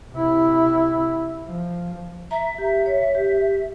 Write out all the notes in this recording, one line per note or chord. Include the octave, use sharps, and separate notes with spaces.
C3 E4
F3
E5 A#5
G4
C#5
G4